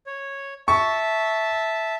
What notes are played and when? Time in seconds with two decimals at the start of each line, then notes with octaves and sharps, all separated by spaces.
0.07 C#5
0.68 E5 A5 C#6